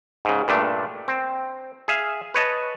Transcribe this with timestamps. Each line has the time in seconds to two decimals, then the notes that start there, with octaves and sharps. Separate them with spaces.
0.25 G#2 C#3
0.48 G2 A#2 A3 D4
1.08 C4
1.88 G#4 E5 F5
2.34 B4 C#5 D#5 A5